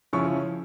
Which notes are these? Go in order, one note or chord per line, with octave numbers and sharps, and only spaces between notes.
C#3 F3 C#4 E4 C#6